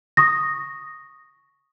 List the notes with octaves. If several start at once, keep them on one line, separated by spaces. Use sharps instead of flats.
C#6 D#6 A#6